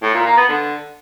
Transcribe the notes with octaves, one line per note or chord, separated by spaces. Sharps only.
A2
A#2
A#3
B3
D3